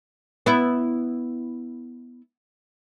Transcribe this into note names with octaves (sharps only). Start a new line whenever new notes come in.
B3 E4